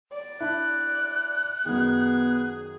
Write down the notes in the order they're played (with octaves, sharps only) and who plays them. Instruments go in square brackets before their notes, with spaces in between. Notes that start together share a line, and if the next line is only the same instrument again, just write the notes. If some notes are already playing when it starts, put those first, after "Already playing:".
[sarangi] D5
[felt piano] D4 E4 [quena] F#6
[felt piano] F#2 D#3 [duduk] B3 [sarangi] G#4